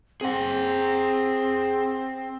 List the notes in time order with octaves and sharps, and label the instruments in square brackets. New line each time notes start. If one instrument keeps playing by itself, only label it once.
[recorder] C4 [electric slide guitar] G#4 F#5